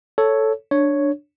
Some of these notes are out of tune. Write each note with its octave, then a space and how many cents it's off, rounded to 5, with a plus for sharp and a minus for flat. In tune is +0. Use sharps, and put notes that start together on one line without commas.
A4 +0 C#5 +0
D4 +0 C#5 +0